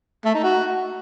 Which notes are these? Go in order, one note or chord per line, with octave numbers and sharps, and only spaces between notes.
A3
D#4
F#4